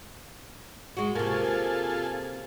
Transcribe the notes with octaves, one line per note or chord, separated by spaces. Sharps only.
G#3 F#4
C3 A#3 F4 G#4 A4